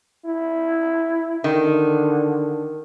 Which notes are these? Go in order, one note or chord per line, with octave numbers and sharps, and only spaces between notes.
E4
D3 D#3